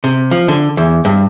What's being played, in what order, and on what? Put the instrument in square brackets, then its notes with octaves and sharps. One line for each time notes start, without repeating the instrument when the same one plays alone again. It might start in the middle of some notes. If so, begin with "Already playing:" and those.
[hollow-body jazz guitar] C3
F3
D3
E2
G2